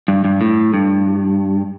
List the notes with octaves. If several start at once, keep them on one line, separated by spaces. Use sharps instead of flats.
G2
G2
A2
G2